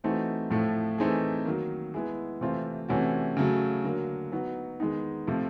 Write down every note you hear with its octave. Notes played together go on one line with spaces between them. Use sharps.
E3 A3 C4 D#4 F#4
A2 F3 A3
E3 A3 C4 D#4 G#4
D#3 F#3 A#3
G#3 B3 E4 G#4
C3 E3 A3 C4 F4
C3 E3 A3 C#4 F#4
C#3 F#3 A3
D3 F#3 A#3
F#3 B3 D#4 F#4
D#3 G#3 B3 D#4
C3 F3 A3